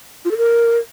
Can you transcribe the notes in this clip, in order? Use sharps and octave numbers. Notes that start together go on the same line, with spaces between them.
F4
A4
A#4